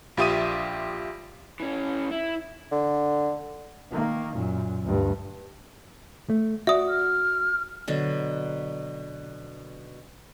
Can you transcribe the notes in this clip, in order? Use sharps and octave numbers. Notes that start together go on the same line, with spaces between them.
A#1 F4 G4 E5 D#6 D#7
E3 C#4
E4
D3
D#3 A#3
F#2 A#2
D2 G2
A3
F#4 D5 E5 D#6
F6
B2 D3 F#3